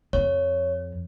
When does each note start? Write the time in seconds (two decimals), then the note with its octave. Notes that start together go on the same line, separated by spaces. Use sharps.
0.13 F2 C#5